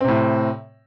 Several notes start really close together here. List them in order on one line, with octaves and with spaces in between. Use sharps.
C4 C3 A2